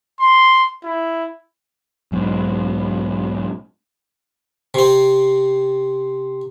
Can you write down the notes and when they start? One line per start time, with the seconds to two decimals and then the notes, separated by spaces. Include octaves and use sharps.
0.20 C6
0.84 E4
2.12 B1 G#2
4.74 C3 C4